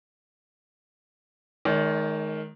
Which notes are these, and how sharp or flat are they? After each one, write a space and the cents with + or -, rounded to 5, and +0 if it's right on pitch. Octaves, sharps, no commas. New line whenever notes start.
D#3 +0 G#3 +30 C#5 +45